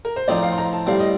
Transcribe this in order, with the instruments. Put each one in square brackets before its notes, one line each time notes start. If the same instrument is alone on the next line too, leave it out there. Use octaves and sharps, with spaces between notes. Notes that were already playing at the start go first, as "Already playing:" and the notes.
[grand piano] A#4
C5
[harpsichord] A2 F3 C4 D#4 [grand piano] D5
[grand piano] F5
C6
A#5
A5
[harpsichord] A2 G3 C4 [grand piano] F5
[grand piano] D#5